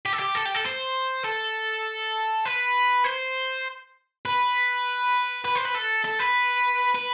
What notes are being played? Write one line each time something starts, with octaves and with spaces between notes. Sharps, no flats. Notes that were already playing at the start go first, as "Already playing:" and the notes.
G4
A4
G4
A4
G4
A4
C5
A4
B4
C5
B4
B4
C5
B4
A4
A4
B4
B4